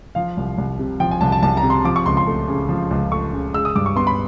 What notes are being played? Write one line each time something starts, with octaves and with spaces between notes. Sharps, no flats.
F3 F5
C2
C2
C3
F3 G5
G#5
C2 A5
A5
C2 A5
A#5
C3
C6
F3 D6
C#6
C#2 C6
C6
A3
C#3
F3
C#2
A3 C#6
C#3
G#3 E6
D#6
G2 D6
C#6
B3 C6
B5